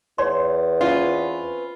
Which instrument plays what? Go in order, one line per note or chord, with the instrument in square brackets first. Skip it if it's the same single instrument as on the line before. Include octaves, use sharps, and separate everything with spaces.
[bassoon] E2 [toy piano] C#5 D5 C6
[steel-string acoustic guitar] C4 C#4 B4 [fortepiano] F4